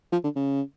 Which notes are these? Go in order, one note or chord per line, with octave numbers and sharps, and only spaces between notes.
F3
D3
C#3